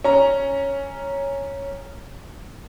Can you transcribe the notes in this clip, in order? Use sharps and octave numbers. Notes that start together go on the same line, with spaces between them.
C#4 A#5